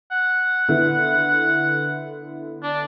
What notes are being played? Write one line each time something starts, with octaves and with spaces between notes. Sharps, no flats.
F#5
D3 B3 E4
D4